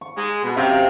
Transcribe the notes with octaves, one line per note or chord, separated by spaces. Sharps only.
C#6
G#3
B2
F#2 C3 E5 F5